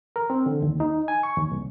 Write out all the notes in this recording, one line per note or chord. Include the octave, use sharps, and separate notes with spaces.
A#4
C4
D3
D#2
D#4
G#5
C#6
D#2
C2